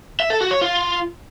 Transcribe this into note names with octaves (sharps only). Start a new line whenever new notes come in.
E5
A4
F#4
C#5
F4